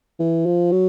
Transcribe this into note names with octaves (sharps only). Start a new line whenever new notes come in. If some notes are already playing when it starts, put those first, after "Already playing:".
E3
F3
F#3